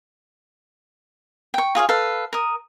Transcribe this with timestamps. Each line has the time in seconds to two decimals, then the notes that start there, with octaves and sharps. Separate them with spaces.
1.54 G5 C#6
1.75 F4 G#4 C#5 F5
1.89 A4 B4 F5
2.33 A#4 D#6